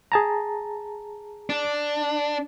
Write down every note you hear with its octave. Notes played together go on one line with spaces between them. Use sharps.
G#4 A5 A#5
D4